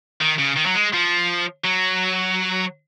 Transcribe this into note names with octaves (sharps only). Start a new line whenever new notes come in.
D#3
C#3
D#3
F#3
G#3
F3
F#3